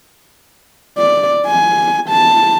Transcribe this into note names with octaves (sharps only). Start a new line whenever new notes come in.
D5
G#5
A5